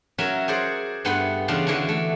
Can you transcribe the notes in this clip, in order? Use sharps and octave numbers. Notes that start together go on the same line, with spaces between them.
F#3 C#4 A#4 E5
G#4 C5 D5 F#5
G2 A3 B3 F#5 C6
E2 C#3 D4 F4 F5
D3 E3 D4 F#4
A3